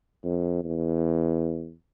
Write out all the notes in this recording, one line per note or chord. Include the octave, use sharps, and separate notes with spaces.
F2
E2